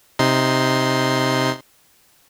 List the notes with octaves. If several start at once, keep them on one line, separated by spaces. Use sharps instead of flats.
C3 D#4 C6